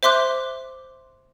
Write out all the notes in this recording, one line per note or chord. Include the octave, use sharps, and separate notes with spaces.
C5 E5 C6 D6 F#6